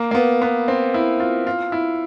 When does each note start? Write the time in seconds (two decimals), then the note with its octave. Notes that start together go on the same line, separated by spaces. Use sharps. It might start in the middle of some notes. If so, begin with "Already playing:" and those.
Already playing: A#3
0.11 A#3
0.15 B3
0.42 B3
0.68 C4
0.94 E4
1.20 F4
1.47 F4
1.72 E4